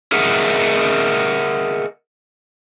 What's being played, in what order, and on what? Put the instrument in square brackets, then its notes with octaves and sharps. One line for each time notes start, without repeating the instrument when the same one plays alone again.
[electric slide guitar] G#4 A#4 D#5 E5 F#5